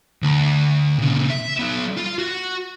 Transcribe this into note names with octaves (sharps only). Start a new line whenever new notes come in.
D2
A#2 C#3
E5
F#3 B3
F4
F#4